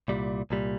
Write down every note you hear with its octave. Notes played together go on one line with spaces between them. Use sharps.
C2 A#2 G3
C2 A#2 G3